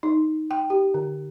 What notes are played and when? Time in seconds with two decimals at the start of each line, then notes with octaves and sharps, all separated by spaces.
0.03 D#4
0.51 G5
0.70 G4
0.94 D3